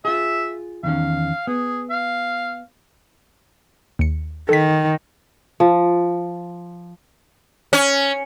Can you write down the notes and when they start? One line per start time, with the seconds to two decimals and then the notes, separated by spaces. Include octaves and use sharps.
0.05 F4 G#4 E5
0.83 E2 D#3 C#4 F5
1.47 B3 G#4
1.90 F5
3.99 D#2 C#7
4.49 D#3 A4 B6
5.60 F3
7.73 C#4